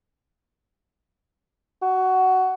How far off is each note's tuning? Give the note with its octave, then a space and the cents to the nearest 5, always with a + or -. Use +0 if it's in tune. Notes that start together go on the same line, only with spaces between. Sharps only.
F#4 +15